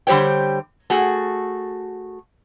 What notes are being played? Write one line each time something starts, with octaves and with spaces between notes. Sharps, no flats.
D3 G3 G4 C5 C#5 G5
A3 F#4 G#4